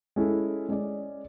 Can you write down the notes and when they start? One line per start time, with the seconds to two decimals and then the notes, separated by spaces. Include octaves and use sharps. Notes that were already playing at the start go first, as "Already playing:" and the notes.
0.16 G#3 C#4 E4 A4
0.69 G#3 C#4 G#4 D5